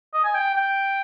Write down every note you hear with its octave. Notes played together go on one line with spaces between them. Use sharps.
D#5
G#5
G5
G5